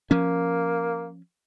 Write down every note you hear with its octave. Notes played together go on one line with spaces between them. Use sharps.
F3 A#3 C#4